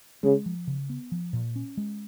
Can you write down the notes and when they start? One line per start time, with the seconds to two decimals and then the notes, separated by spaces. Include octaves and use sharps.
0.23 C#3 G#3
0.46 F3
0.67 C#3
0.89 B3
1.12 F3
1.33 A#2
1.56 C#4
1.77 G#3